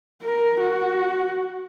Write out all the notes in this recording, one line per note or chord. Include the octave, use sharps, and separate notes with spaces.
A#4
F#4